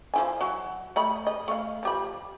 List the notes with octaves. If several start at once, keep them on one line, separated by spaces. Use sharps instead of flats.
F3 E4 G#5
F#3
A3 D#5 B5
D#5
A3 F5
F3 G4 B5